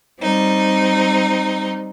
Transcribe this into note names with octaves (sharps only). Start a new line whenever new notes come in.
G3 C4 D#4